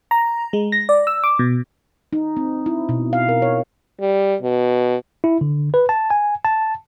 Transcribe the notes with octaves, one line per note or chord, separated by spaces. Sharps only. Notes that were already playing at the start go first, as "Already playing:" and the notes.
A#5
G#3
A#6
D5
E6
D6
B2
D#4
C4
E4
B2
F5
A#4
C#5
G3
B2
E4
D3
B4
A5
G#5
A5